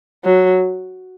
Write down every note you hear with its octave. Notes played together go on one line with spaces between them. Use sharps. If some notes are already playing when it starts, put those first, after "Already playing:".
F#3